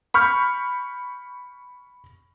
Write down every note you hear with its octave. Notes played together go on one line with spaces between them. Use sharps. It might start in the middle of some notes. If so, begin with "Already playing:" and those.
B5 C#6 F6 G6